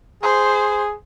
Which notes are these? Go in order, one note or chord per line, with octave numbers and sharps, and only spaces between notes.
G#4 C5